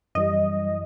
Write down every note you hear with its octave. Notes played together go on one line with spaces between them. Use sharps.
F#2 E3 G3 D#5